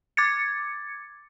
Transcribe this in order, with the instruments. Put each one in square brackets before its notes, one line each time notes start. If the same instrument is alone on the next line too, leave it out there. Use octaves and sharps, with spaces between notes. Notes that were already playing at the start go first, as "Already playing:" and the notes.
[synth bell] D6 G#6 A6 C#7